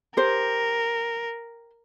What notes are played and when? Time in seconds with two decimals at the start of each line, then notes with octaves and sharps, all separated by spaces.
0.17 G4 A#4 C5